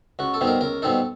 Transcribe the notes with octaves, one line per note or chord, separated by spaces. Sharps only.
C#2 F#4
A4
B2 G3 C4 D#4
A#4
C#2 A#4
B2 G3 C4 D#4 A4